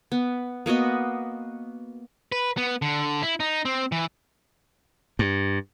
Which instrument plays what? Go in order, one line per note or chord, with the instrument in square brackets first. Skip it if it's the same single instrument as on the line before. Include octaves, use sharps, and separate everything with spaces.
[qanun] B3
A#3 B3 F#4 D#5
[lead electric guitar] B4
B3
D3
E4
D#4
C4
E3
[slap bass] G2